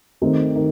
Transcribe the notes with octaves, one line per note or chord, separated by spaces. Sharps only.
D#3 A3 C4 D#4 G4
D#3